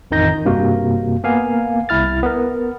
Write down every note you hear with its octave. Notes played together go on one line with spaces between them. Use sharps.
A1 F2 D#3 D#4 G6 A#6
G2 C3 A#3 F#4
A#3 B3 F5 G#5
C2 E4 F6 A6
B3 A#4